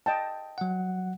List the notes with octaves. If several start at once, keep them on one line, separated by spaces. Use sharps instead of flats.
D#5 G5 A5
F#3 F#5